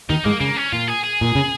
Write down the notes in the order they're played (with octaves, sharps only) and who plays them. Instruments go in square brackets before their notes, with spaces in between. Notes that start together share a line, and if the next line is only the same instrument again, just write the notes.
[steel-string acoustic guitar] D#2 D#3 [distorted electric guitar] D#4
[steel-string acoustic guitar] G#2 G#3 [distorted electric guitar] A#3
[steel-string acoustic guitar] C#3 [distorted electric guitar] A#3
[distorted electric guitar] C#4
[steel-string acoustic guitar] A#2 [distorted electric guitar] F4
[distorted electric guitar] G#4
G#4
[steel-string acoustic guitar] A#2
C#3